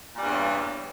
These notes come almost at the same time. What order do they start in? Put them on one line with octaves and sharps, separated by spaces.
A#2 G3 G2 E2 C#3